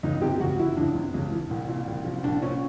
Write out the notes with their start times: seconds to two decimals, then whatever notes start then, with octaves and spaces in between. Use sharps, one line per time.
0.03 C#2 D#4
0.22 C3 G4
0.40 C#2 F#4
0.59 E3 E4
0.77 C#2 D4
0.95 C3
1.14 C#2
1.31 E3
1.51 C2
1.68 A#2
1.88 C2
2.05 F3
2.24 C2 D4
2.42 A#2 C#4